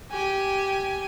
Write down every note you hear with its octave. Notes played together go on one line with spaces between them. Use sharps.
G4 G#5